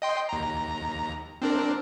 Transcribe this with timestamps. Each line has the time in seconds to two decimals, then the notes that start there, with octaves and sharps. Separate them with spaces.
0.02 D#5 G5 C6
0.29 D#2 A#5
1.42 C4 D4 A#4